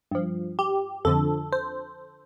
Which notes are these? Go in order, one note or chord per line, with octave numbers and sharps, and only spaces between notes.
G2 F3
G4
F2 D3 F3 A4
C5